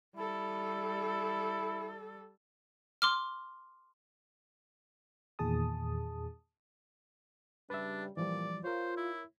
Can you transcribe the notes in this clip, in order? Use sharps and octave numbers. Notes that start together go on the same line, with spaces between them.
G3 E4 A4
C6 D6 F6
E2 A#2 D#3 G#4 A5 D#6
C#3 G3 D4 B4 E5
A#2 E3 F3 G3 D5
F4 A#4 C5 C#5
E4